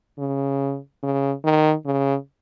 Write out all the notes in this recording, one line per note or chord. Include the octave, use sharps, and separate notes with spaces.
C#3
C#3
D#3
C#3